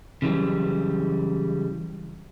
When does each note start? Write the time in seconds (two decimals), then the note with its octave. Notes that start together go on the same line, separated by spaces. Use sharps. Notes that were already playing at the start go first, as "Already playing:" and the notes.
0.22 C#3 E3 F#3 G3